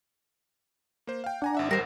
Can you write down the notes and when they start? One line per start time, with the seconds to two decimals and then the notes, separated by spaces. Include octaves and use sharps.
1.07 A#3 C5
1.24 F5 G5
1.42 D4 F#5 G#5 A#5
1.55 G#1 E5 F#5
1.71 G3 A#4 C5